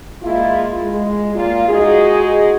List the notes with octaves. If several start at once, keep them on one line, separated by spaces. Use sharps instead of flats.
G#3 A#3 E4 F4
G#3
A#2 F4
G#3 D#4 F#4 G#4